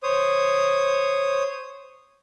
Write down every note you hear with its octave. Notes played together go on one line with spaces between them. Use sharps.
C5 C#5 D#6